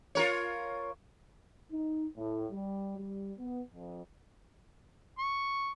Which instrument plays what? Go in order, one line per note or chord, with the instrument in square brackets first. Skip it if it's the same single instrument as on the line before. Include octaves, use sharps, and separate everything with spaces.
[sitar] F4 A#4 C#5
[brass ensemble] D#4
A2
G3
G3
B3
F2
[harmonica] C#6